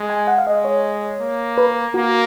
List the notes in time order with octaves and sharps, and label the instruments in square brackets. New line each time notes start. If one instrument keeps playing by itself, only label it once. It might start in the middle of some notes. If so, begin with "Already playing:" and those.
Already playing: [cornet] G#3
[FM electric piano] G#5
F#5
F5
[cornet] G#3 [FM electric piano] D#5
[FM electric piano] C#5
[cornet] A#3
[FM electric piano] B4
[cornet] A#3 [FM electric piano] F#4